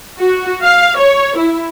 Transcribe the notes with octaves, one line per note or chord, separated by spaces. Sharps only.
F#4
F5
C#5
E4